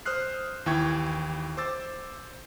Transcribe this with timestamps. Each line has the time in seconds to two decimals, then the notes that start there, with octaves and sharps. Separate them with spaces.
0.06 C5 D#6 F6 F#6 C7
0.66 D#2 E3 E4 G5 C#6 G#6
1.57 C5 D6 E6 A6